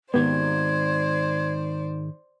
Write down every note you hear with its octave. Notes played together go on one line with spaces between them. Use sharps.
G#2 D#3 B3 G4 C5 D5 G#6